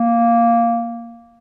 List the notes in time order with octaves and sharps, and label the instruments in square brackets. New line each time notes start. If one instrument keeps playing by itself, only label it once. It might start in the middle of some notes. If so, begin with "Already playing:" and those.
Already playing: [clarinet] A#3